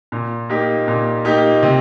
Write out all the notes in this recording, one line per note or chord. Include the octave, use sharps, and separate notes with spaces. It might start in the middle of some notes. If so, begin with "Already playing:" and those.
A#2
A#3 D#4 G4
A#2
A#3 D#4 G4
C3